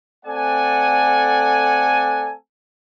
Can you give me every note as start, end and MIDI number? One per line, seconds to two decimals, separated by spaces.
0.26 2.33 57
0.26 2.33 60
0.26 2.33 69
0.26 2.33 74
0.26 2.33 78
0.26 2.33 80